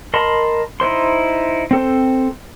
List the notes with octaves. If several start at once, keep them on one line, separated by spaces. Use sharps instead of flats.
A#4 D#5 A5 B5 C6
D#4 E4 C5 C6
C4 A4 C5